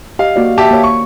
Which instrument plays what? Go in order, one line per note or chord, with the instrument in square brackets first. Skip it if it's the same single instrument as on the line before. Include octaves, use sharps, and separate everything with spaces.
[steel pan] G4 D#5 [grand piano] F5
[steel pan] A#3 F#4 D5
[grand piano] G4 E5 A5
[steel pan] A#3 C#5
[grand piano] C#6